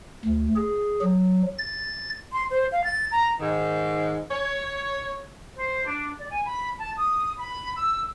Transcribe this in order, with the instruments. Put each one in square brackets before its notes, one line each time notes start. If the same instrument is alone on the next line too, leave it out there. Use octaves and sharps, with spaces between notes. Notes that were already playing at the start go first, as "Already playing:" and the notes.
[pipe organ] D2
G#4
F#3
A6
[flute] C6
C5
F5
A6
A#5
[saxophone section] G#2 D#3
C#5
[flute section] C5
D4
D5
G#5
B5
A5
D#6
B5
E6